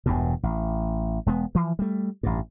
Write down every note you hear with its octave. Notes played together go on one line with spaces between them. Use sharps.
E1 E2 G2 B2
A1
E1 G#3 B3
E3 F3
G3 A3
A1 G2